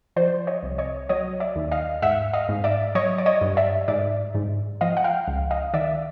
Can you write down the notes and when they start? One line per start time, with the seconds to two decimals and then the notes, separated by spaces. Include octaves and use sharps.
0.16 F3 C5 D5
0.47 C#5 D#5
0.63 C2
0.78 C#5 D#5
1.09 F#3 C#5 D#5
1.40 D5 E5
1.56 D#2
1.71 D#5 F5
2.02 G#2 E5 F#5
2.33 D#5 F5
2.49 G#2
2.64 D5 E5
2.95 F#3 C#5 D#5
3.18 D5
3.26 C#5 D#5
3.41 G2
3.57 D5 E5
3.88 G#2 D5 E5
4.35 G#2
4.81 F3 D#5 F5
4.97 F#5
5.04 F5 G5
5.28 C#2
5.51 D#5 F5
5.74 D#3 D5 E5